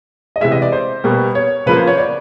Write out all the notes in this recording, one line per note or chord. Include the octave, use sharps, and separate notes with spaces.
D#5
C3 E3 G#3 E5
D#5
D5
C5
B2 G3 A#3
C#5
C#3 F3 A#3 B4
C5
C#5
D5